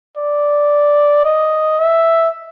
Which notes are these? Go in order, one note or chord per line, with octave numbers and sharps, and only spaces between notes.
D5
D#5
E5